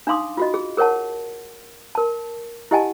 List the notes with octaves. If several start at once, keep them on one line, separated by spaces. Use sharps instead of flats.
D4 D#4 F5 C6 D6 D#6
F4 F#4 D#5
G#4
G#4 A#4 C#5 F#5 A5
A#4 A5
E4 G4 D#5 F#5 G#5 A5